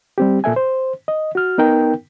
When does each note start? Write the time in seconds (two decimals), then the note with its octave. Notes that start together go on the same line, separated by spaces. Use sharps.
0.18 G3 C4 G4
0.44 A#2 A4 E5 G#5
0.56 C5
1.08 D#5
1.35 F#4 F6
1.58 B3 D#4 A#4 G5